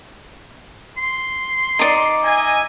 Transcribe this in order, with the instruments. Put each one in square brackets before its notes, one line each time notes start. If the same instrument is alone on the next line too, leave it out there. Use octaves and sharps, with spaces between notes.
[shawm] C6
[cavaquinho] D#4 D5
[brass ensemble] D#5 E5 G#5